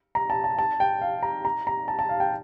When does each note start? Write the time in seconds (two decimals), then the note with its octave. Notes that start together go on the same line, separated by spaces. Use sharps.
0.15 A#5
0.30 A5
0.44 A5
0.59 A5
0.80 G5
1.01 F5
1.23 A#5
1.45 A#5
1.67 A#5
1.88 A5
1.99 A5
2.09 F5
2.20 G5